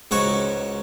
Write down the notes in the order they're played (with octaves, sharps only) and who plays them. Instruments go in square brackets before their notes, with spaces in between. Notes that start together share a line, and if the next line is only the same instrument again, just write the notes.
[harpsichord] C#2 G#2 F#4 C#5 C#6